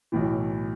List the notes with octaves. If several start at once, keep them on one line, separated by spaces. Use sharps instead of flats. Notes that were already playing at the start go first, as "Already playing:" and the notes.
B1 A2 E3